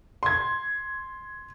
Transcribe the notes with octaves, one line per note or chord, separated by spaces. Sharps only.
C6 G#6